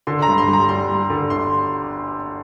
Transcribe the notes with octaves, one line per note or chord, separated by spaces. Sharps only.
D3 C6
A#5
G2
C6
G2
A#5
G3 C6
G3
D3
G1 C6